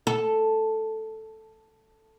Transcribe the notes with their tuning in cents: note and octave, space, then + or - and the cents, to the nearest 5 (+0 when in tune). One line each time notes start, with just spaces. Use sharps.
A4 +0